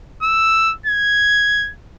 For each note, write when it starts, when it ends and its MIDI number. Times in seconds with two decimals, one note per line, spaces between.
0.22 0.73 88
0.86 1.70 92